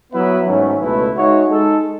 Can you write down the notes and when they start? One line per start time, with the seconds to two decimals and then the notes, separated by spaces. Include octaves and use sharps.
0.12 F#3 B3 E4 B4 E5
0.46 G#2 D#3 F#3 A3 C#4
0.80 C#2 B2 A3 E4 B4
1.15 G#3 D#4 F#4 C#5 E5
1.49 G#3 D#4 A4